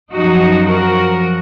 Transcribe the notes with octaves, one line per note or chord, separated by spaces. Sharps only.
F#2 F3 D#4 F#4
F#4 A#4